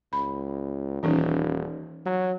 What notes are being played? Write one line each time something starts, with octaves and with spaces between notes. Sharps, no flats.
C#2 B5
D#1 E3 C#4 D#4
F#3